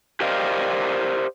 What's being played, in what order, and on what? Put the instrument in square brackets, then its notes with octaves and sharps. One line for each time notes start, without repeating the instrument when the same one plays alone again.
[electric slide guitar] G4 A#4 C5 D5 D#5 F5